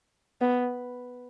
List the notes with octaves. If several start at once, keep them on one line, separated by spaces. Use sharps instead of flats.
B3